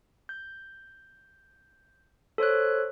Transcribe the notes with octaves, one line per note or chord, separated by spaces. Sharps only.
G6
A4 C5 C#5 F#6